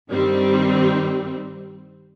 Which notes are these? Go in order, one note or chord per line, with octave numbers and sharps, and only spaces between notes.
G2 D#3 G3 C4